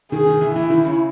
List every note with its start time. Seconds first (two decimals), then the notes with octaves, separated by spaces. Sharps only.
0.12 D#3 G#4
0.26 D#3
0.41 E3
0.56 E3 E4
0.70 D#3
0.85 C#3